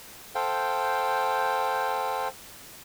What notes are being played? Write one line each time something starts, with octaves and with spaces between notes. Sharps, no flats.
A4 C5 F5 G5